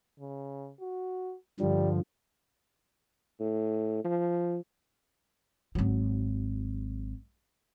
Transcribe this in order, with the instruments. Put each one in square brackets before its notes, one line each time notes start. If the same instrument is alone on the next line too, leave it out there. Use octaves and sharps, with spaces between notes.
[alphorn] C#3
F#4
[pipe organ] G2 D3 F3 [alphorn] G3
[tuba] A2
F3
[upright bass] G#1 F#3